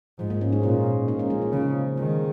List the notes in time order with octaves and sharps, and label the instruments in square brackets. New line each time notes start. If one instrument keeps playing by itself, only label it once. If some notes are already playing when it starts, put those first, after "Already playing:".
[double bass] G#2 [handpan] F3
[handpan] F3 A#3
G#3 C#4
A#3 D#4
[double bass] A#2 [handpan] C#4 F4
[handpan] A#3 D#4
G#3 C#4
F3 A#3
F3
[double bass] C#3 [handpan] F3
[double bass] D#3 [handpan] G#3